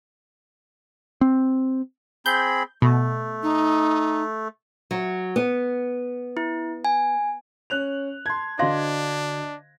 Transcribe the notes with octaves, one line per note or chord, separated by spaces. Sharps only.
C4
C4 G#4 B5 G6
B2 A3
D#4
F#3
B3
E4
G#5
C#4 F#6 F7
A5 C6 G#6
D3 D4 F#4 C5 D#5 F5 C6 A#6